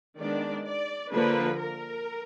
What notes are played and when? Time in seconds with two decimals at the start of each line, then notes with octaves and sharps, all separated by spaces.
0.17 D#3 G#3 B3 D4 D5
0.64 D5
1.11 D3 F3 A#3 D4 B4
1.58 A#4